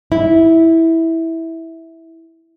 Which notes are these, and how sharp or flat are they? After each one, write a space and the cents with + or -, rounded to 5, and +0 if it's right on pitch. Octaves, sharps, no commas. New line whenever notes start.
E4 -10